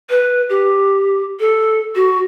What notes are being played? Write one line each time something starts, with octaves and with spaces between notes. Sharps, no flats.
B4
G4
A4
F#4